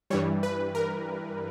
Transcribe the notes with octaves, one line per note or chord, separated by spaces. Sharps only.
G2 E3 G3 C#5
B4
A#4